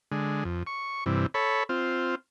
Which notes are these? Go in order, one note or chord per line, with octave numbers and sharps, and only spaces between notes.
D3 G#3
F2
C#6
G2 C3 E3
A4 C#5 B5
C4 F4